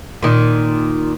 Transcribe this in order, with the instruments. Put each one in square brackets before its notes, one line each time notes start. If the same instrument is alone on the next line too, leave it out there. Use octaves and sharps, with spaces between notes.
[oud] A#2 D#3